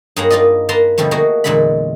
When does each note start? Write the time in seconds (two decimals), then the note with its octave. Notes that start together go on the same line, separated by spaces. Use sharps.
0.16 G2 F#3 A#3 G#4 F#5 A#5
0.30 D#4 F4 A#4 D5 D#5
0.69 A#3 B4 F5 A5 A#5 C6
0.98 B2 D3 F3 G3 A3
1.11 A3 A#3 F#4 G#4 D#5
1.44 E2 A#2 D3 G#3 F#5 B5